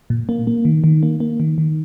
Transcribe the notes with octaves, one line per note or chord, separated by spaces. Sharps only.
A#2
A#3
A#3
D#3
D#3
A#3
A#3
D#3
D#3